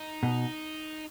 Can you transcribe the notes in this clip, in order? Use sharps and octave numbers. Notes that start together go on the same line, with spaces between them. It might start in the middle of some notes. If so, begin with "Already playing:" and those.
Already playing: D#4
B2